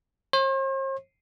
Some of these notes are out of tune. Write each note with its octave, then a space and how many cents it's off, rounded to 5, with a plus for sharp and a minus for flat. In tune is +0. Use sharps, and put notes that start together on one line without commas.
C5 +45